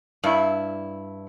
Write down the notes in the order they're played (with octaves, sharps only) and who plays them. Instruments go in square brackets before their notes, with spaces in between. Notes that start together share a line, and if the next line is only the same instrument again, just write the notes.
[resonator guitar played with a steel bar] G2 E4